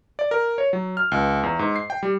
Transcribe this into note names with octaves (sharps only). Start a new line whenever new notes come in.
D5
A#4
C#5
F#3
F6
C#2
E2
G#2
C7
G5
G3